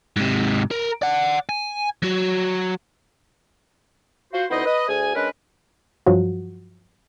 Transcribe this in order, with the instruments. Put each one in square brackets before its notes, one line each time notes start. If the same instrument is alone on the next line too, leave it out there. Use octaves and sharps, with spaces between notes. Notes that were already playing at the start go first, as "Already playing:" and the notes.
[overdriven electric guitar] G#2 C3
A#4
D5 F#5
G#5
F#3 F#4
[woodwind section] F4 F#4 C5
D2 B3 D#4 E4 C5 D#5
B4 D#5
D2 G#4 G#5
G#3 C#4 D4 A#4 B4
[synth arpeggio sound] G2 F3 F#3 F4 F#4